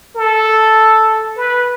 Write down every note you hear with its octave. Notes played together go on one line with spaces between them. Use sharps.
A4
B4